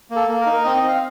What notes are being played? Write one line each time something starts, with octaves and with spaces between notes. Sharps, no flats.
A#3
A4
A#3
A#4
D#4
A#4
C4 D#5
D#5
C4 F5